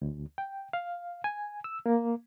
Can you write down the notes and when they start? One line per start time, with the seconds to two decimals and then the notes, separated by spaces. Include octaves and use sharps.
0.02 D2
0.38 G5
0.73 F5
1.24 G#5
1.64 E6
1.86 A#3